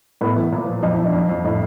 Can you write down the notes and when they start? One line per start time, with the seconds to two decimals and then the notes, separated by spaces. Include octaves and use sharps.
0.21 A2 B3
0.36 E3
0.52 A#2
0.67 F3
0.83 F2 D#4
0.93 E4
0.99 F2
1.04 D4
1.13 F2
1.29 F2
1.44 A2 D#4